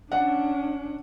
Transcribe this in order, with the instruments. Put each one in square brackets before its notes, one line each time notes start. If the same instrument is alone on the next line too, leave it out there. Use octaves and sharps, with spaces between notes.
[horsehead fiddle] C#4 D4 [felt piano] F#5